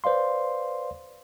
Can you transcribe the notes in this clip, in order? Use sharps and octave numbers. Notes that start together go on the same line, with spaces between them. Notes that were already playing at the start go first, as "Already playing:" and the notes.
B4 C5 D5 F5 C6